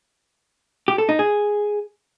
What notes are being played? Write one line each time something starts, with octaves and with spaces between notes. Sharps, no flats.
G4
A4
D#4
G#4